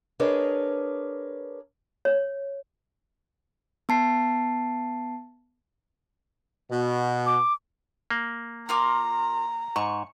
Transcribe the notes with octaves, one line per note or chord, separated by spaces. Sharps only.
D4 G#4 A#4 B4 C#5 D#5
C#5
B3 A5 C7
B2
D6
A#3
F4 A#4 A#5 D6
G#2 C#6